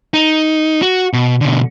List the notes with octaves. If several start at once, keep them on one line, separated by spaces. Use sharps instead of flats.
D#4
F#4
B2
B2 D3